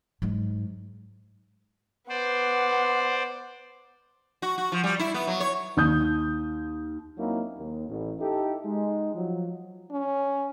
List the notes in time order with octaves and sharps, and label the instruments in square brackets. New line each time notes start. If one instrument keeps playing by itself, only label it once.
[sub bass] G#2 [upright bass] F#3 G#3
[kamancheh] B3 F#5 [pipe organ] C5 D5
[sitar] F#4
F#4
F3
G3
E4
B3
F#3
C#5
[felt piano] D#2 D#6 G6
[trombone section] F#3 A#3 C4 C#4 D#4 E4
D#2
A1
D#4 E4 G4 A4
G#3 D#4
F3 F#3
[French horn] C#4